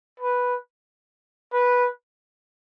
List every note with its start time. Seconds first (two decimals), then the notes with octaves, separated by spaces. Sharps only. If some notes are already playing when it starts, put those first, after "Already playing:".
0.20 B4
1.53 B4